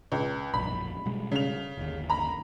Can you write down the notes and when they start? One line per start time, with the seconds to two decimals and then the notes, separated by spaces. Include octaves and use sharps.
0.12 C#2
0.54 E1 A#1 F#2 B5
1.06 B2 G3 G#3
1.32 C#3 F7
1.77 G1 D#2
2.10 A#5 B5